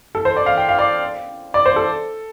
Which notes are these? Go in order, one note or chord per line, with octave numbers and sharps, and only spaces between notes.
A4
C5
D5
F5
G5
F5
D5
D5
C5
A4